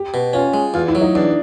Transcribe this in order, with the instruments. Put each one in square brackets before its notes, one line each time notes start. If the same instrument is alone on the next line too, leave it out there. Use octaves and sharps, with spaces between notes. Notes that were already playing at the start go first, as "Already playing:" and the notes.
Already playing: [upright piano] G4
[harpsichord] B2
[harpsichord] C#4 [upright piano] F4
[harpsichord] G#3
[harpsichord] E2 [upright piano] F4
[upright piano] E4
[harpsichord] F#3
[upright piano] D#4
[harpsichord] E2 [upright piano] D4